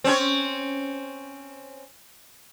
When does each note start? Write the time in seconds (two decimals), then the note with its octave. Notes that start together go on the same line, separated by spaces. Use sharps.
0.04 C4 C#4 C#5